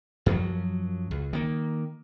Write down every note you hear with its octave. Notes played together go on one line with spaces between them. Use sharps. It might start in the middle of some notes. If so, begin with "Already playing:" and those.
F#2 F3 F#3
C#2
D#3 A#3